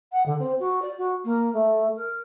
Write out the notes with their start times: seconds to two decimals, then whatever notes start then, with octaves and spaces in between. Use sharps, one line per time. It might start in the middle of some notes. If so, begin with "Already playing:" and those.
0.12 F#5
0.26 D3
0.39 C4
0.59 F#4
0.82 D5
0.98 F#4
1.24 A#3
1.53 A3
1.95 A#4